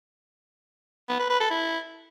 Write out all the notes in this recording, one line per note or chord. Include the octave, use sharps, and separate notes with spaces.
B3
B4
B4
A4
E4